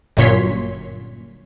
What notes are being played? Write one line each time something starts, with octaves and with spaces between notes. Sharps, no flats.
G1 F#2 A#2 C#5 C6 B6